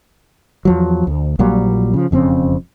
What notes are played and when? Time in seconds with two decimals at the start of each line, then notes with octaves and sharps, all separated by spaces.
0.65 E2 F3 F#3
1.07 D2
1.39 A#1 A#2 F#3 G3
1.94 C#3 F3
2.11 E1 F2 C#3 C4